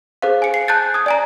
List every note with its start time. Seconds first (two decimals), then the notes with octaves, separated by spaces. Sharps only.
0.22 G#4 C5 F5
0.42 G#5 C#7
0.54 C7
0.68 A5 F#6 G6 A6
0.94 D#6 G#6
1.06 D5 G#5 A#5